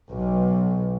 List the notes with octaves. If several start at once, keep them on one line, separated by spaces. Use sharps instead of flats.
B1